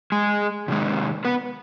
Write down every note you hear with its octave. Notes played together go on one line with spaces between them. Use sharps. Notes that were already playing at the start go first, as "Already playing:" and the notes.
G#3 G#4
C3 D#3 G#3
B3 B4